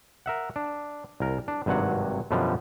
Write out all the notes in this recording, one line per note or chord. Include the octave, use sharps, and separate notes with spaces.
A#4 E5 F#5
D4
C2 A#4
D4
G#1 G2 C3 F#3 F#5
F#2 B2 D3 F3 G3